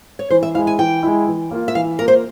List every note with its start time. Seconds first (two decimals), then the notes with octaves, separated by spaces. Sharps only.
0.19 C#5
0.30 E3 C5
0.43 E5
0.54 G#3 E4 F5
0.67 G#5
0.79 E3 G5
1.03 G#3 E4
1.27 E3
1.51 A#3 F4
1.68 E5
1.75 E3 F5
1.99 A#3 F4 A#4
2.08 C5